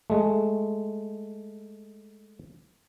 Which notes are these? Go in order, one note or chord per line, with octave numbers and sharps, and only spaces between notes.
G#3 A3